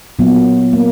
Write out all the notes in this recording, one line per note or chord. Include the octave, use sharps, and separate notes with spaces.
A#2 F#3 A#3 B3
A#3